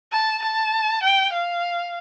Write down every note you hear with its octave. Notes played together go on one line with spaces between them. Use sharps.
A5
A5
G5
F5